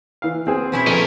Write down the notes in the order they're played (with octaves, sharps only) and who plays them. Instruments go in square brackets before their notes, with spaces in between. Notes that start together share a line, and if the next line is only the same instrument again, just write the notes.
[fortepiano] E3 F5
[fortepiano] B3 [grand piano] C4 G#4
[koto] B2 C#4 E4
[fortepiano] A#1 A#3 [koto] A3 [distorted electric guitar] C#4 A#4